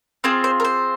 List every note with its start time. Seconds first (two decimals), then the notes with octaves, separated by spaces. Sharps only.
0.24 C4 F4 G#4 C5
0.44 C5
0.60 A#4
0.65 C5